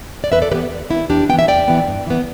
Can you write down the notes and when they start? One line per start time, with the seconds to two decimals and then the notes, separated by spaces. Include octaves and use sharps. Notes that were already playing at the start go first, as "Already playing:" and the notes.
0.24 D5
0.32 E2 B4 E5
0.42 A4 D5
0.51 E3 G4 B4
0.55 B3
0.71 E2
0.90 E3 B3 E4
1.10 E2 D4 G4
1.29 B3 G5
1.33 E3
1.39 E5
1.48 E2 D5 G5
1.68 E3 B3
1.87 G2
2.07 E3 B3